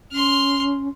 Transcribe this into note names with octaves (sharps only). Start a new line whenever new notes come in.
C#4 C6 F6